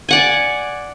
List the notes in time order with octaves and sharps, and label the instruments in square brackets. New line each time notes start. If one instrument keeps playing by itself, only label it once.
[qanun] D5 F#5 G#5